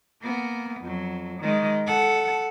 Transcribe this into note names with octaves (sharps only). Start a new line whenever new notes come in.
A#3 B3
F2 F#3
D#3 G#3
A4 F#5